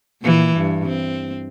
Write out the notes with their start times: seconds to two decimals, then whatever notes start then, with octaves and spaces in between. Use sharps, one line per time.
0.22 A#2 E3
0.56 G2
0.87 C4